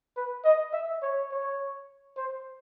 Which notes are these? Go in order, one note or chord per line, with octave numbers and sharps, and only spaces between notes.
B4
D#5
E5
C#5
C#5
C5